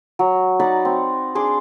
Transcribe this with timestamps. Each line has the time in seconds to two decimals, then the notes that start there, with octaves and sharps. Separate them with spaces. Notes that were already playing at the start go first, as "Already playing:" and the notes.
0.19 F#3
0.60 D#4 D5 F#5 B5
0.85 C4
1.35 D4 G#4 C6 D6